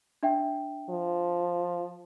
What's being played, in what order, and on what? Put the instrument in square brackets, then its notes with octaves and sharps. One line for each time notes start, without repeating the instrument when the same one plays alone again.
[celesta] D4 E5 G5
[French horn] F3